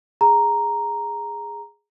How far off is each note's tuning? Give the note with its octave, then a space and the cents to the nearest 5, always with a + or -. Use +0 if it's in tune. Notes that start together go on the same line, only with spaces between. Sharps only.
G#4 -5 A#5 +0